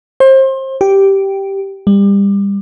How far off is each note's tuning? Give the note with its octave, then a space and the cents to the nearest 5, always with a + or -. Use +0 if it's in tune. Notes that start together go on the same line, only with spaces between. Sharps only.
C5 +30
G4 -5
G3 +30